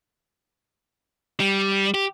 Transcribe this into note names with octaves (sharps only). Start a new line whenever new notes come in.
G3
G4